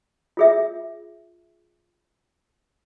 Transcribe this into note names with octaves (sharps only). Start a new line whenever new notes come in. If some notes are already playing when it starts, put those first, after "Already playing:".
F4 G#4 E5